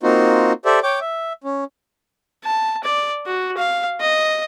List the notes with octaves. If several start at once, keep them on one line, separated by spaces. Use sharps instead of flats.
A#3 C4 D#4 F4 F#4
G4 A4 C5 D5 E5
C#5 G5 D6
E5
C#4
A5
D5
F#4
F5
D#5